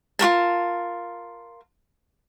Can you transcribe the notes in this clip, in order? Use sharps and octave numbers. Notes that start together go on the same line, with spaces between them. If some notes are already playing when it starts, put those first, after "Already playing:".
F4 F#4 A#4 A5